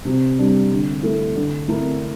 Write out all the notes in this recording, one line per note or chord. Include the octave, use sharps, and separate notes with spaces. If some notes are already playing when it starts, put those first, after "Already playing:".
C3
G3 D4
D3
A3 E4 A4
D3
A3 E4 A#4